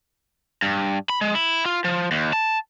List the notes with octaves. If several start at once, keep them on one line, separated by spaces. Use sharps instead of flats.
G2
B5
G#3
E4
F4
F3
D#2
A5